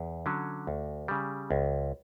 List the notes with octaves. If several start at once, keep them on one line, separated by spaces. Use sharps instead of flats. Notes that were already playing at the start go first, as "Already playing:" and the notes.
Already playing: E2
D3 F#3 C#4
D2
C#3 G3
C#2